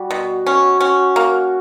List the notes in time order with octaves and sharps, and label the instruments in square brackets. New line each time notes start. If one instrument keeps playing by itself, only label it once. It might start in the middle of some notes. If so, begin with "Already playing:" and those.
Already playing: [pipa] G3 [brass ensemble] F#4
[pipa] B2
C#4
C#4
A#3